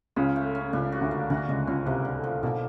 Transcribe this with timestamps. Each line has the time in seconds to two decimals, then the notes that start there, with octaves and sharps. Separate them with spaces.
0.16 C#2 C#3 F4
0.36 A3
0.55 C#4
0.73 C#2 C#3 D4
0.92 F#4
1.01 D2 D3
1.11 A#3
1.30 D2 D3 F#4
1.48 C#2 C#3 G#3
1.67 C#2 C#3 C#4
1.86 C2 C3 A#3
2.05 D3
2.24 F3
2.43 B1 B2 A#3